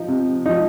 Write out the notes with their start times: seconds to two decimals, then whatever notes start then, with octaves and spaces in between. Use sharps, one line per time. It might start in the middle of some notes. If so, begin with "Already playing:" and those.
Already playing: F3 D#4
0.08 C3
0.46 F3 D#4